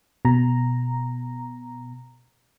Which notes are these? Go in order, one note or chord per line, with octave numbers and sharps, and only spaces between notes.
B2 A#5